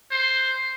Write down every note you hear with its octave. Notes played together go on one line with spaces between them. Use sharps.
C5